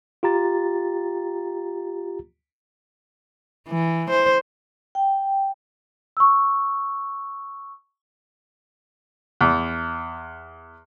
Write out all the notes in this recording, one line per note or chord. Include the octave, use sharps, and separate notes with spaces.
F4 G4 A#5 A6
E3
C5
G5
C#6 E6
E2